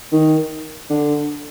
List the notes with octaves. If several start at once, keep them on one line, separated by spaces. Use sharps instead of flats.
D#3
D3